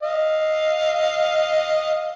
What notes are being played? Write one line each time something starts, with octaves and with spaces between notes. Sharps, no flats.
D#5 F5